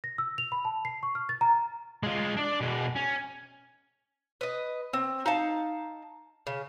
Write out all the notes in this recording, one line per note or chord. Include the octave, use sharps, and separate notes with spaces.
A#6
E6
F7
B5
A5
C7
C#6
F6
A6
A#5
G#3 F4
D4 D5
B2 G#3
C#4
B4 D#5
C4
D#4 F5 A5
C#3